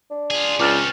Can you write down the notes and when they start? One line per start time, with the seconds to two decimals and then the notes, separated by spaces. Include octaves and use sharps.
0.10 D4
0.31 F4 G#4
0.60 C#2 C4 C#4 D6 F6 A6